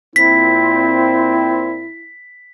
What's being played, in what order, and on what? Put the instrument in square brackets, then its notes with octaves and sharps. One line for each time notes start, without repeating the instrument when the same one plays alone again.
[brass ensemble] A#2 C4 [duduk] E4 [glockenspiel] B6